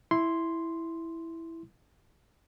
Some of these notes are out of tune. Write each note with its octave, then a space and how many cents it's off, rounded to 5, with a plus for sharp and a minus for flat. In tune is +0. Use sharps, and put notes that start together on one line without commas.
E4 +0 C6 +0